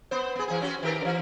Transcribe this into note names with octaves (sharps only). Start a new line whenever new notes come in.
B3 C5
B3 G#4
E3 G#4
C4 C#4 F#4
D#3 G4 A#4
C#3 E3